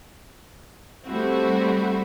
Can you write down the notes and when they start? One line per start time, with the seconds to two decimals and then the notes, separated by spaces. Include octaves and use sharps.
1.06 G3 A3 C4 E4 F#4